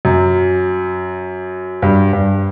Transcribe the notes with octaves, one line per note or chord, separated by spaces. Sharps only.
F#2
G2
G2